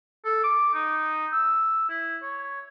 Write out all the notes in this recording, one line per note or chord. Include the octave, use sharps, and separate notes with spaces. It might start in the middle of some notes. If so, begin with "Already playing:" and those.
A4
D6
D#4
E6
E4
C#5